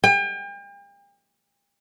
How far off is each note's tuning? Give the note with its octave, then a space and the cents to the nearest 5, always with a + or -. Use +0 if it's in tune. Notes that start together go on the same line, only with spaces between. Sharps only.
G5 +40